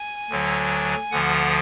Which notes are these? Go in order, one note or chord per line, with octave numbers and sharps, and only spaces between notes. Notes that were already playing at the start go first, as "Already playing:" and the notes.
Already playing: G#5
D2 D3 F#3
D2 D3 F3 F#5